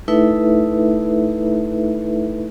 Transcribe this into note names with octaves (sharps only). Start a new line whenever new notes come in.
A3 D#4 E4 A4 B4 E5